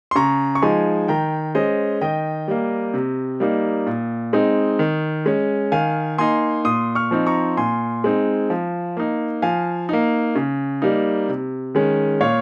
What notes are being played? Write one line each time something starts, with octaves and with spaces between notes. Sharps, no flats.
C6
C#3 A#5 C#6
C#6
F3 G#3 D#4 G#5 C6
D#3 G5 A#5
G#3 C#4 C5 D#5
D#3 D#5 G5
G3 A#3
C3
G3 A#3 D#4
A#2
G#3 C4 D#4
D#3
G#3 C#4
D#3 F5 G#5
A#3 D#4 G#5 C6
A#2 C6 D#6
C#6 F6
F3 C4 D#4
A#5 C#6
A#2 G#5 C6
G#3 C4 D#4
F3
A#3 D#4
F3 F5 G#5
A#3 D#4
C#3
G3 A#3 D#4
C3
D#3 G#3 C#4
A#2 C#5 F5